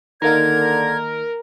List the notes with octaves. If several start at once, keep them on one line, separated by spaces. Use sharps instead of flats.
D3 D#3 A#3 D#4 A#4 G#6